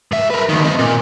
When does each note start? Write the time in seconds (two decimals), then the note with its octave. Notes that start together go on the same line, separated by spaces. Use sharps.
0.12 G2 E5
0.30 A#4 B4
0.49 D2 D#3
0.64 C4 D#5
0.79 A#2